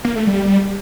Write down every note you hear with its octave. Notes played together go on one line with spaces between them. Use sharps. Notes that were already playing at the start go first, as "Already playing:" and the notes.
A#3
A3
G3